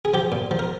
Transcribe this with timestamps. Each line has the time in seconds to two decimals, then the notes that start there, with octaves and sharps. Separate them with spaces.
0.05 G#4
0.14 F3 G4
0.32 A#2
0.51 F3
0.59 A#4